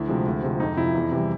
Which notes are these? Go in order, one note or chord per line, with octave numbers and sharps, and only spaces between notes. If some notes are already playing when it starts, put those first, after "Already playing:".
Already playing: D2 E4
C3 F3 G#3
D2
C3 F3 G#3
F2 D#4
C3 F3 E4
E2
C3 E3 G3